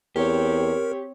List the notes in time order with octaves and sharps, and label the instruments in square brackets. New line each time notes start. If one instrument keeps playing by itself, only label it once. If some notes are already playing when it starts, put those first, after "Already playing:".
[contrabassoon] E2 [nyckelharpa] C4 C#5 [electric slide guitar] G4 [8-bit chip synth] A#4